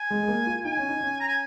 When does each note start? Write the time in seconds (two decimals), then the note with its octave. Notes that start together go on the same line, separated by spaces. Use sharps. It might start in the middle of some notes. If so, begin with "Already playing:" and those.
Already playing: G#5
0.10 G#3
0.23 G#3
0.28 A#3
0.46 F4
0.64 D#4 G#5
0.77 C#4
0.89 D#4
1.01 C#4
1.20 A#5
1.28 G#5